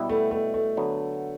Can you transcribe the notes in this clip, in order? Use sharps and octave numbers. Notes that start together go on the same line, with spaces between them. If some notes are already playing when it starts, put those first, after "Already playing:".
Already playing: B2 G3 B3 E4
A3
A3
A3
D3 F#3 B3